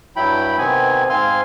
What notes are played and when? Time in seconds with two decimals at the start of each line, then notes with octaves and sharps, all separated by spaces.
0.16 G2 F#3 E4 G5 B5
0.58 C3 D#3 B3 C4 G#5
1.10 G#2 C4 F5 G#5 C6 F6